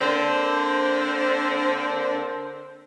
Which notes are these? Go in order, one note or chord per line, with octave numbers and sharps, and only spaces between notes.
D3 A#3 C4 D4 C5